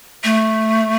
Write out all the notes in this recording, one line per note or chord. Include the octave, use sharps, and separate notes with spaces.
A3